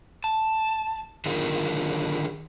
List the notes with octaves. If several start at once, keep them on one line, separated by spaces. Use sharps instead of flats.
A5
D3 D#3 F#3 F4 G#4 A#4